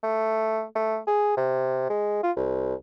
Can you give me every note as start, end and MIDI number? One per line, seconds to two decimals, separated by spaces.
0.03 0.64 57
0.75 0.98 57
1.07 1.35 68
1.37 1.88 48
1.90 2.23 56
2.23 2.31 65
2.36 2.74 36